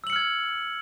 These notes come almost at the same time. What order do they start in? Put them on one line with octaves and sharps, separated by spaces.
E6 F#7 C#7 F6 G#6